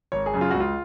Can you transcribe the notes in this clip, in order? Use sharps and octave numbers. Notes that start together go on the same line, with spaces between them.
G#1 C#5
G#4
F#2 C#3
F4
C#2 F#4
F4